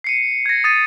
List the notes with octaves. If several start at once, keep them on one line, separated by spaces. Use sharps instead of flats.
C7 C#7 D#7
G#6 A#6
D#6 A6 D#7